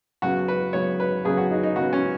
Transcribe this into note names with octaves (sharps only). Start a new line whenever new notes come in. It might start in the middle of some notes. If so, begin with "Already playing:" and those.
F#2 C#3 B3 F#4
B4
F#2 C#3 B3 C#5
B4
F#2 C#3 B3 G#4
F#4
D#4
D#4
F#2 C#3 B3 F#4
C#4